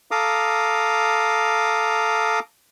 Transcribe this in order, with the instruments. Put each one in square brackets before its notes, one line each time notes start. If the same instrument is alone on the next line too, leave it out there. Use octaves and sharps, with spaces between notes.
[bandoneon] A4 F5 A#5 D6 D#6